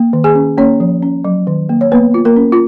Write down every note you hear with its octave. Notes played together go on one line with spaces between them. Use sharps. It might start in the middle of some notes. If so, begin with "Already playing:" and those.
Already playing: A#3
D#3
G#4 G#5
C#4
A#3 C#4 C#5
F3
C#4
F#3
D#3
A#3
C#5
A#3 B3 B4
F4
A#3 A#4
C#4
F4